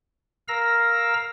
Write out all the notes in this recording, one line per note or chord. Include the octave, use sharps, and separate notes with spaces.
A#4 F5 A#5 E6 A#6